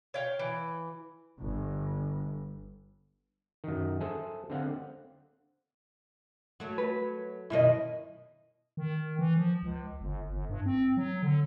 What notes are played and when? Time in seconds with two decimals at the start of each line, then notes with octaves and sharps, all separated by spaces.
0.14 C#5 F5 G5
0.39 E3
1.39 G1
3.64 F#2 D#3
4.01 G#4 A4 C5 E5
4.50 D3 C4 F5 F#5
6.60 F#3 A3
6.78 B4
7.50 F#2 B2 D#3 E4 D#5
8.77 D#3
9.19 E3
9.37 F3
9.63 C#2
10.01 G1
10.30 G1
10.49 G2
10.66 C4
10.97 F#3
11.22 D3